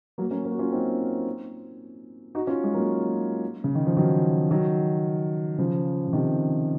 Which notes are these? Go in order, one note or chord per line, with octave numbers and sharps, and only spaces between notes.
F#3 A#3
A#3 C#4
A#3 C#4
F#4
C#4 F4
C4 D#4
D#4 F#4
C#4 F4
G#3
F#3 A#3
C#3
D#3
F3
D#3 F#3
D#3 F#3
C#3 F3
C#3
C3 D#3